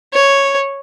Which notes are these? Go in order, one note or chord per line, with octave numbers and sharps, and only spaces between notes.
C#5